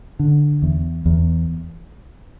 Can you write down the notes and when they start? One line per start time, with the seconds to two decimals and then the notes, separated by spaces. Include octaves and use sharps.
0.19 D3
0.62 E2
1.06 E2